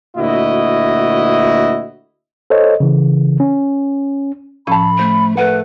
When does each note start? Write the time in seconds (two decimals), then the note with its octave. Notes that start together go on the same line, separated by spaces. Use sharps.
0.17 D2 A#2 E4 F#4 D#5
2.50 A4 C5 C#5 D#5
2.80 C#3 E3
3.40 C#4
4.67 A2 F3 C#4 A4 A5 B5
4.99 A3 C5
5.37 A3 A#4 B4 F#5